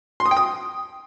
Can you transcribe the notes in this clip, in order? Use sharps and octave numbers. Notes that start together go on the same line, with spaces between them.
C6
D#6
G5
D#6